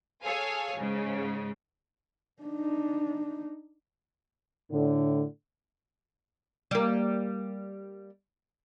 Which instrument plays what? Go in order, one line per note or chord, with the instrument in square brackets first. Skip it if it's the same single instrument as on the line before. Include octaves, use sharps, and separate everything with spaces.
[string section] G#4 A4 C#5 F5 G#5
G#2 C#3
[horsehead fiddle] D4 D#4
[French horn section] A2 D3
[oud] G3 A#3